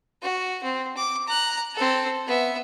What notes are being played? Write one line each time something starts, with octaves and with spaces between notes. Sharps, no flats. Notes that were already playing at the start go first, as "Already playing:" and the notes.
F#4
C4
D6
A#5 F#6
C4 A4
B3 E5